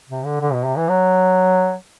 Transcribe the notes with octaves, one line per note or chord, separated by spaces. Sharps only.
C3
D3
D3
B2
C3
E3
F#3